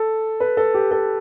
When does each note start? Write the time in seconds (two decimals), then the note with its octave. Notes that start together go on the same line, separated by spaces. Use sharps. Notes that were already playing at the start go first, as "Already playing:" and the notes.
Already playing: A4
0.40 B4
0.57 A4
0.74 G4
0.91 A4